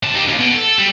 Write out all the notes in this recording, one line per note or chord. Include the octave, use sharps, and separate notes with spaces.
C3 A5
D#4 G4
D#2 C#3
B2
A4
G3